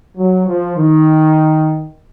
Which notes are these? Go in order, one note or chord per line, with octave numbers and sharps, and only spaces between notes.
F#3
F3
D#3